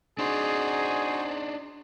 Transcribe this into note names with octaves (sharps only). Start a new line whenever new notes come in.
D4 D#4 F#4 G#4 C5